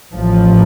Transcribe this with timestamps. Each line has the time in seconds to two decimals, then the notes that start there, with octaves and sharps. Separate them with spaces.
0.14 A1 A2 F3